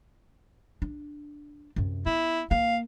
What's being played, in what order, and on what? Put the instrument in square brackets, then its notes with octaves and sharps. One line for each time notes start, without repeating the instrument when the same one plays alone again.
[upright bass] D4
F#2 C3
[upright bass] B3 [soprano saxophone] E4
[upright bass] A#3 [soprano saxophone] F5